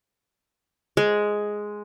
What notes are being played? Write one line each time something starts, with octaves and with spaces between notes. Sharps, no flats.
G#3